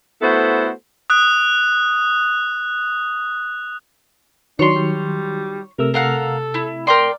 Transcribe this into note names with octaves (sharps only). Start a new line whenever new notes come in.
A3 B3 E4 F#4 A4 C5
D#6 F#6
D#3 F#3 D4 C#5 C6
G3
C3 A3 A#4 E6
A4 A#4 F5 F#5
E4
A#4 D5 G5 C6